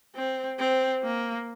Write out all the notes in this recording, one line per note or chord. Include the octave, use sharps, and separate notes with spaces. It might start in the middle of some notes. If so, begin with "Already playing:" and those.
C4
C4
A#3